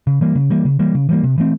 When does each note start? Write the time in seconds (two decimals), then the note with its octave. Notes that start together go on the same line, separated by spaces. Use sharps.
0.07 C#3
0.21 E3 G3 A#3
0.35 C#3
0.50 E3 G3 A#3
0.65 C#3
0.79 E3 G3 A#3
0.95 C#3
1.09 E3 G3 A#3
1.23 C3
1.38 E3 A3 C4